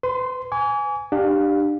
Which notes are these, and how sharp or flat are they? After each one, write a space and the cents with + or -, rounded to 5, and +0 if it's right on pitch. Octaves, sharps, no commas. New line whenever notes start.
B4 +35 C6 -5
G#5 +0 D6 -45
D4 +30 G4 +0 F5 +20